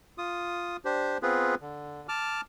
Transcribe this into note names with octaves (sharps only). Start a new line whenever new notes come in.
F4 D#6
D4 G4 C5
B3 C4 F4 G#4 B4
D3
A5 D6 F6